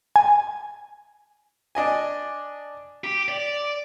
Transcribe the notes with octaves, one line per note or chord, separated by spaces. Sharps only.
G#5
D4 D#5 G#5
G4
D5